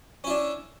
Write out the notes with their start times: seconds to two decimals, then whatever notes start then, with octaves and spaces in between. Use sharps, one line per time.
0.24 C#4
0.27 E4
0.30 D4